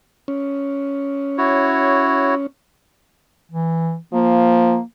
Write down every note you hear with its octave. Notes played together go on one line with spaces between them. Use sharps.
C#4
E4 F#4 C#5
E3
F3 A#3